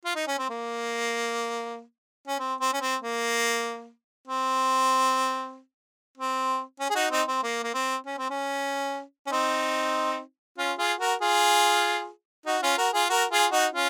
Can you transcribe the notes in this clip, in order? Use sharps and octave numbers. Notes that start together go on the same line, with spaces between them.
F4
D#4
C#4
C4
A#3
C#4
C4
C4
C#4
C4
A#3
C4
C4
C#4
G#4
D#4 F#4
C4 D#4
C4
A#3
A#3
C4
C#4
C4
C#4
C#4
C4 D#4
C#4 F4
F4 G#4
F#4 A#4
F4 G#4
D#4 F#4
C#4 F4
F#4 A#4
F4 G#4
F#4 A#4
F4 G#4
D#4 F#4
C#4 F4